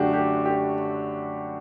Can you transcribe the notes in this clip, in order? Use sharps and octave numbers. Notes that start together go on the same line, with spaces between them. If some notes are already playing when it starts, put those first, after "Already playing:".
Already playing: F#2 D3 A3 D4 F#4 G4
G4
G4